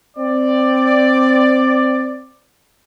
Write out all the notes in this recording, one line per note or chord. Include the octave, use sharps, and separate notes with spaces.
C4 D5